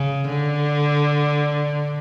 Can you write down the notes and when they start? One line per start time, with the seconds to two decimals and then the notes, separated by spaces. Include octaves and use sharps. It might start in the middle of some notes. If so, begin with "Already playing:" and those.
Already playing: C#3
0.28 D3